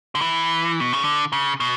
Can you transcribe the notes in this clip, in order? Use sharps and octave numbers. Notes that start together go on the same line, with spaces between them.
D3
E3
B2
C#3
D3
C#3
B2